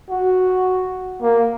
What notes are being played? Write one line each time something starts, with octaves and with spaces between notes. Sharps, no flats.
F#4
A#3